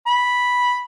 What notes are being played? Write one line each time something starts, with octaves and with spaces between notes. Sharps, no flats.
B5